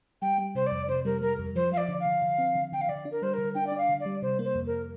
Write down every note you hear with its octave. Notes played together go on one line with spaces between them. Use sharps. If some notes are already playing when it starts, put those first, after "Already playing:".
G3 G5
G3
C3 C5
D5
F2
C3 C5
G3 A#4
G3 A#4
F2
F3 C5
F3 F5
D5
D3
F5
D3
D3
C4
D3
D3 G5
F5
D3 D5
D4
A#4
G3 C5
D3 A#4
D4 G5
D4 D5
F5
D3
D5
G3
C3 C5
A#3
C5
F2
A#4